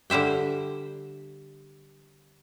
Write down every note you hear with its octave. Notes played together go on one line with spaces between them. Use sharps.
D3 G3 C5 E5 G5